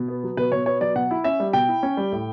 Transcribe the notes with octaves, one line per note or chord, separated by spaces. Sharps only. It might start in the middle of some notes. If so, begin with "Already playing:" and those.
Already playing: B2
B3
F#3
B2 B4
B2 C#5
B3 C#5
F#3 D5
B2 F#5
E4
C#4 E5
G3
B2 G5
E4
C#4
G3
A2